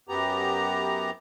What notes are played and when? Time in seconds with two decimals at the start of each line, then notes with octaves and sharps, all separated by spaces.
0.09 F#2 B3 G4 A#5